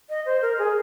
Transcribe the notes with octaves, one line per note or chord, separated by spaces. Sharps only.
D#5
C5
A#4
G#4